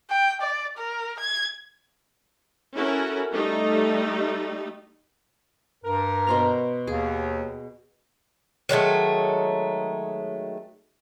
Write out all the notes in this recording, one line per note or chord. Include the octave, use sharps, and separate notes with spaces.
G5
D5
A#4
G#6
C#4 E4 F#4 A4 A#4
G3 A3 D#4
G2 A#4
B2 C5 A#5
D#2 G#4
D#3 F#3 G#3 A3